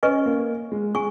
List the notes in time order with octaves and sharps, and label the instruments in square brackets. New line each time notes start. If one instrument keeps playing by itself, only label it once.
[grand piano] C#4 [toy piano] B4 D#5 G#5 C#6
[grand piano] A#3
G#3
[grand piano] G#3 [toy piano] G#5 C#6